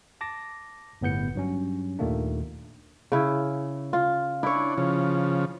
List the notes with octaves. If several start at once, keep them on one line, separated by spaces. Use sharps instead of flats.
A5 D6 A#6
G1 A2 B3 G6 C#7
G2 F#3 C#4
D#2 A#2 D#3 A3 A#3 D4
C#3 E4
F4
D4 E4 C#5
C#3 F3